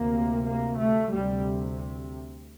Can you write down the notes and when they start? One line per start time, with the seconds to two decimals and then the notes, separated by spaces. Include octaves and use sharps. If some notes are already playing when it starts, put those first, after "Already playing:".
Already playing: D2 C3 A#3
0.45 A#3
0.78 A3
1.10 D2 C3 G3